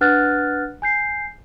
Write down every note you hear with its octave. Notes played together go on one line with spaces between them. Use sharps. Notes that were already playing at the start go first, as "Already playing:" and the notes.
D4 B4 F#5 F6 F#6 A6
G#5 G6 C7